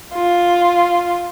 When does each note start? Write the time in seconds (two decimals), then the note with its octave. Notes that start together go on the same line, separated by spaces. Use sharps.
0.15 F4